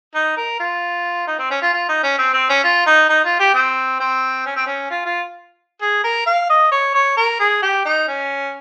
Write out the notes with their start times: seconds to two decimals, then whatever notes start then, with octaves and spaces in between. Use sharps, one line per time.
0.14 D#4
0.37 A#4
0.59 F4
1.27 D#4
1.39 C4
1.51 C#4
1.62 F4
1.73 F4
1.88 D#4
2.03 C#4
2.18 C4
2.33 C4
2.49 C#4
2.64 F4
2.86 D#4
3.09 D#4
3.24 F4
3.40 G4
3.54 C4
4.00 C4
4.46 C#4
4.56 C4
4.66 C#4
4.90 F4
5.05 F4
5.81 G#4
6.04 A#4
6.26 F5
6.50 D#5
6.72 C#5
6.94 C#5
7.17 A#4
7.40 G#4
7.62 G4
7.85 D#4
8.08 C#4